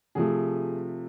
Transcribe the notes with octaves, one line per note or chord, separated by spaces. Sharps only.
C3 F3 A3 G#4